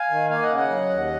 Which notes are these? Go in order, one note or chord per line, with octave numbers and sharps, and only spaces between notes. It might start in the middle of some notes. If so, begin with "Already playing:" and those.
Already playing: F5 G#5
D#3
A#3 F5 G#5
D#5 F#5
C#3
D#5 F#5
F#3
D#2